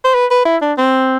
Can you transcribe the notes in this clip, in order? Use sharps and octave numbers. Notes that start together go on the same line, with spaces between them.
C5
B4
B4
E4
D4
C4